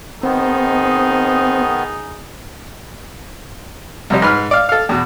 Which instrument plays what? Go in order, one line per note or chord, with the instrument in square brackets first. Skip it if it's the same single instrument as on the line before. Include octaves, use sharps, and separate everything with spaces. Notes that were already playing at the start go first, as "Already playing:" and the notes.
[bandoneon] D#3 B3 [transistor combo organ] C4 [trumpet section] D#4 G#4
[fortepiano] C2 F2 G3
G#2 B4 F6
D5 F5
A4 F5
E2 B2